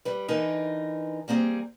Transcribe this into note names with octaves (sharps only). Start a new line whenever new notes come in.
G3 B4
D3 E3 D#4 A#4 B4
G3 A#3 C4 G#4